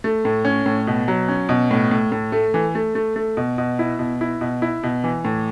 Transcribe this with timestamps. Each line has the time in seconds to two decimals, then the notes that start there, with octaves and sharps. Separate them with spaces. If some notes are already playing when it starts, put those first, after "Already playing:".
0.04 A3
0.25 A2
0.45 C#4
0.66 A2
0.87 B2
1.08 F#3
1.28 C#4
1.49 B2
1.71 A2
1.91 A2
2.12 A2
2.32 A3
2.54 E3
2.75 A3
2.95 A3
3.16 A3
3.37 B2
3.58 B2
3.79 E4
3.99 B2
4.21 E4
4.41 B2
4.62 E4
4.83 B2
5.04 E3
5.25 A2